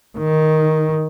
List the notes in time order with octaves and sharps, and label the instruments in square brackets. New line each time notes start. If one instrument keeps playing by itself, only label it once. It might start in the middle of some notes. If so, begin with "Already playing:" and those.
[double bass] D#3